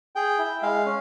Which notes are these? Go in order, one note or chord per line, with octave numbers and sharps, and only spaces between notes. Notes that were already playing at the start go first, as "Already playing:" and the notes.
G#4 G5
E4
G#3 F5
C#4